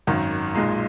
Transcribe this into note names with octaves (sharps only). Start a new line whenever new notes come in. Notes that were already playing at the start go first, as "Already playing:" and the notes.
G#1 F#2 D#3
B1 A#2 G#3 D#4